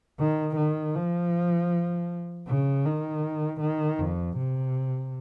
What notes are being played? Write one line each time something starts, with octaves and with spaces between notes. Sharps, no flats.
D#3
D#3
F3
C#3
D#3
D#3
F2
C3